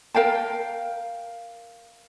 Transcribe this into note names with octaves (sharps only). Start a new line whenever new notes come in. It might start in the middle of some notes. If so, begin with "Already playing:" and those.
A#4 F5 G5 A5